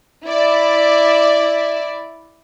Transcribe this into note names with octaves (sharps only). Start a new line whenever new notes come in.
E4 D5